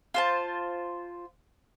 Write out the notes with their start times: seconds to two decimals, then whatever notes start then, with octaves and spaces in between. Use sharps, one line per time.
0.14 F4 C5 A5